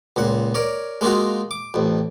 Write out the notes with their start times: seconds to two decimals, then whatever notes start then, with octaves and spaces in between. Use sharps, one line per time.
0.16 C#2 A#2 F#5
0.54 A#4 C#5 D5
1.01 G#3 A#3 D#4 F4 F#4
1.51 D6
1.74 A1 F2